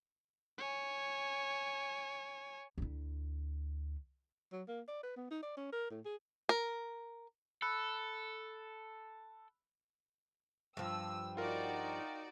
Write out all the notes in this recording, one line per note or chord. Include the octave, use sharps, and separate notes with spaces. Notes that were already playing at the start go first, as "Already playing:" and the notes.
C#5 G#5
D2 E4
F#3
A#3
D5
B4
B3
D#4
D5
C#4
A#4
A2
G#4
A#4
A4 B5 E6 F#6
G2 F3 G5 E6
D#4 F4 F#4 A#4 D5